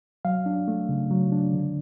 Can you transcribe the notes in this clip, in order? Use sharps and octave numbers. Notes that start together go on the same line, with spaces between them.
F#3 F5
D4
A3
C#3
F#3
D4
D3